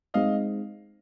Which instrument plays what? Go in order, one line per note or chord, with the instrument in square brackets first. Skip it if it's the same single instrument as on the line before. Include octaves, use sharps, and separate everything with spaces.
[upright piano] G#3 C4 D#4 [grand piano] D#5 F5